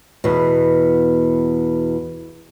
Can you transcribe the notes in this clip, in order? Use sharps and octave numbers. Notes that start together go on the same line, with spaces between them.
E2 B2